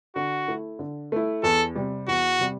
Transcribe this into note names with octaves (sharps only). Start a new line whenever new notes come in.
D3 F#4
A3 E4
D3
A3 E4
E2 A4
C3 G3
E2 F#4
C3 G3